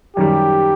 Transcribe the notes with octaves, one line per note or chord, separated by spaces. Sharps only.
F#2 D#3 G3 G4